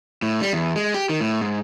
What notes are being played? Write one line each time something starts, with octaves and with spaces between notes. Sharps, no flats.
A2
G3
E2
G#3
G4
D#3
A2
G#2